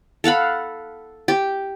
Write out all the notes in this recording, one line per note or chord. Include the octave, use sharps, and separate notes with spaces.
A4 F5 F#5 B5
G4